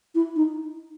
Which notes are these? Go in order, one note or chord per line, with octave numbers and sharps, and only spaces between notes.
E4
D#4